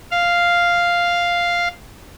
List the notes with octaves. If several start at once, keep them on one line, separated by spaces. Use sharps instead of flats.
F5